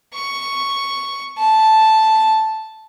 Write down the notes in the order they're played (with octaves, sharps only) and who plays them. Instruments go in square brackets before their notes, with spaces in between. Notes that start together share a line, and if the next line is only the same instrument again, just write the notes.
[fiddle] C#6
A5